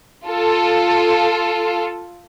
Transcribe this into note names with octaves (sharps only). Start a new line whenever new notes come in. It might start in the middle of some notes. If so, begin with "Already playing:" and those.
F4 A4